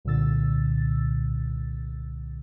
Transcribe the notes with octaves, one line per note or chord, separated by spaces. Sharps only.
C2 A#2 D3 E6 A6